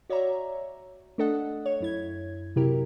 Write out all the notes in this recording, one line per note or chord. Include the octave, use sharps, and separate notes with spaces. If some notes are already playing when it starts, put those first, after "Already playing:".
F#4 C#5 D5 E5 A#5
A3 D4 A4 D#5 F#5
C#5
F#2 E4 G#6
C3 F#3 E4 G4 A#4